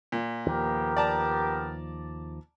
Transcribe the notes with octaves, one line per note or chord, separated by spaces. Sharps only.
A#2
D#2 F3 B3 G4 A#4
D5 A5 A#5